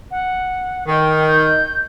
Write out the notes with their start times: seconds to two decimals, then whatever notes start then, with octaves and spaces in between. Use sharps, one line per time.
0.11 F#5
0.87 D#3 G5
1.27 G6